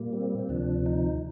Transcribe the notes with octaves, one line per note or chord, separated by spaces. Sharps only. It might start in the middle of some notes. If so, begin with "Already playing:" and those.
Already playing: A#2 G3 A#3
C4
C4
D2 C3 F3 D4
D#4